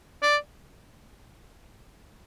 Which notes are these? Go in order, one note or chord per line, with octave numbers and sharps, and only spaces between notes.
D5